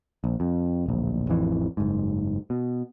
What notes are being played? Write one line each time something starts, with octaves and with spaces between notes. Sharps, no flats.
A#1
F2
D1 A#1
A1 F2 E3
F#1 G#2
B2